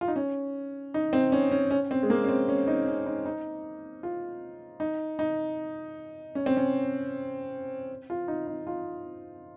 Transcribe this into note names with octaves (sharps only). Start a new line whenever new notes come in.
F4
D#4
C#4
D#4
C4
C#4
C#4
C#4
C4
G#3
A#3
C#4
C4
C#4
D#4
C#4
D#4
D#4
F4
D#4
D#4
C#4
C4
C#4
F4
D#4
D#4
F4